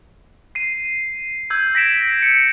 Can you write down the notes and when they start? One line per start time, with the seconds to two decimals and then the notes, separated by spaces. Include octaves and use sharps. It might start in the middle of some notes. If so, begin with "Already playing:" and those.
0.55 C7 D#7
1.50 E6 G6 G#6
1.75 A#6 B6 D7 E7
2.22 C#7